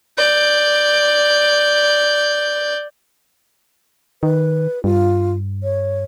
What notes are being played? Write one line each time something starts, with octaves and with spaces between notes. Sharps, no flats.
D5 G6
D#3 B4
G2 F4
C#5